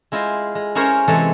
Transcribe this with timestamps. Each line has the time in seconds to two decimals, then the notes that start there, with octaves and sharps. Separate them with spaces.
0.12 G#3 E4 F4 C5 D#5
0.55 G#3
0.75 C#4 E4 G#4 A#4 C5 C#5
1.08 C3 E3 G#3 A4 C#5